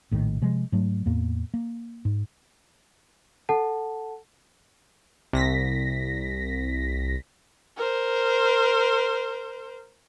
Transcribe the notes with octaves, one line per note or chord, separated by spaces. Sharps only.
A#1 A2 C3 D#3
C3 F3 G#3
G#2 F#3 A3
E2 A2 A#3
A#3
G#2
A4 F#5 A5
C2 A#6 B6
A#4 C5